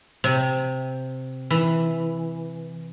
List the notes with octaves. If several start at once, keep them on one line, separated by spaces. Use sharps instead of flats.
C3
E3